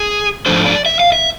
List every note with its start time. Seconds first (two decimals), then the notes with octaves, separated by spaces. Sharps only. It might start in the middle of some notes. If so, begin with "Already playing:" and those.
Already playing: G#4
0.46 G#2 F3 A3 D4 C5
0.66 D5
0.86 E5
1.00 F5
1.12 E5